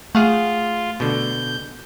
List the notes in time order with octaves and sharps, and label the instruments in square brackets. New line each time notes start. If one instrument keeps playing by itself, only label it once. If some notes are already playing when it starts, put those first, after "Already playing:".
[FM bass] A3 [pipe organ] F4 [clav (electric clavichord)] G#4 F5 F#5
[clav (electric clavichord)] B2 D3 [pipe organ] G6